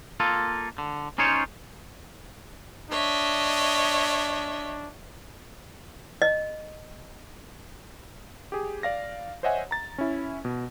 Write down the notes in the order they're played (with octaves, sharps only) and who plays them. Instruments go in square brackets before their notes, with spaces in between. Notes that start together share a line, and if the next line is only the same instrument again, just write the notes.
[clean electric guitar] A#3 F4 A4
D3
C#4 D#4 F4 C5 C#5
[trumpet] D4 [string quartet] C#5 D#5 E5
[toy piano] D#5
[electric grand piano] G4 G#4
D5 F5 A#6
C5 C#5 D#5 E5 F#5 G#5
A#5 A6
C#4 E4
B2